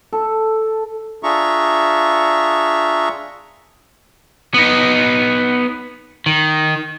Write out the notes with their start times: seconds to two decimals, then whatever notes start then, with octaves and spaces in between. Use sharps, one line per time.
0.13 A4
1.23 D4 F4 G#4 E5 A#5 C#6
4.54 B3 D#4
6.26 D#3